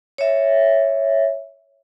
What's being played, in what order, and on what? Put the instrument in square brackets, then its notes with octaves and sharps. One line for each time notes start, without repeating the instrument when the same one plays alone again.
[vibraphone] C#5 E5